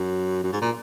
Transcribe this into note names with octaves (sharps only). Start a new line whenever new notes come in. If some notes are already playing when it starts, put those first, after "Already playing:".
Already playing: F#2
F#2
G#2
A#2